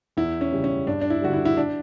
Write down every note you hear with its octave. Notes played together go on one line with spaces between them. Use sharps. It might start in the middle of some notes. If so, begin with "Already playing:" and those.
E2 E4
C#4
C#3 G3
C#4
G2 D4
D4
E4
D3 G3 F#4
E4
E4
D4